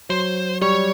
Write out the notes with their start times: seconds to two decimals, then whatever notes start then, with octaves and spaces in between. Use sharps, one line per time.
0.10 F#3 C5
0.62 G3 C#5